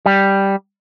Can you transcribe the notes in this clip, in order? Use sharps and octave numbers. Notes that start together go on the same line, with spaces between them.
G3